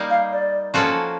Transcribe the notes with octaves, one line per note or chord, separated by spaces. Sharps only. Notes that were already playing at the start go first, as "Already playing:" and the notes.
Already playing: G3 A#3 D#4
F5
D5
F3 A#3 C#4 F#4 A4